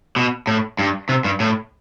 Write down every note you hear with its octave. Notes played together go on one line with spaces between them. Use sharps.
B2
A2
G2
C3
G2
A2